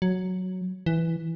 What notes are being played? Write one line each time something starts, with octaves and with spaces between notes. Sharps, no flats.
F#3
E3